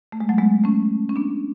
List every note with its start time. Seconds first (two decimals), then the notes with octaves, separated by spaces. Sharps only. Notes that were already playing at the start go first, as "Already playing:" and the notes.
0.12 A3
0.20 G#3
0.29 F#3 A3
0.38 G#3 B3
0.64 A3 C#4
1.09 C#4
1.16 B3 D4